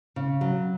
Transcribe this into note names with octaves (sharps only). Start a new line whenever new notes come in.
C#3
F#3